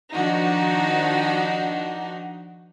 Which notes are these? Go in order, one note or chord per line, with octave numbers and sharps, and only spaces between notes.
D#3 F3 D4 D#4 F#4